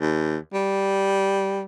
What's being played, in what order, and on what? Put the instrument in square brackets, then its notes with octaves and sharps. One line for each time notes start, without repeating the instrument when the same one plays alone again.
[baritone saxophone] D#2
G3